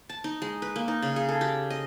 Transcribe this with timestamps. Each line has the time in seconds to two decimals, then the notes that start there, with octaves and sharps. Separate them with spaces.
0.09 A5
0.24 D#4
0.42 G#3
0.62 B4
0.76 A#3
0.88 D#4
1.02 C#3
1.16 G#4
1.29 A4
1.41 G4
1.70 D#5